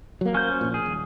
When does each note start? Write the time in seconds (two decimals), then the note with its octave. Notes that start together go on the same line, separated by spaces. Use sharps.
0.21 F#3 A#3
0.35 C#4 C5 G6
0.61 A#1 A#2
0.74 G#4
0.86 D#1